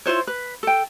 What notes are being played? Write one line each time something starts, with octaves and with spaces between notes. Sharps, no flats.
E4 F4 C5 C#5
B4
A4 G5